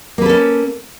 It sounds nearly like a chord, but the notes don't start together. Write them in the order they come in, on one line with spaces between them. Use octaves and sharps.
A#3 B4 A4 C#4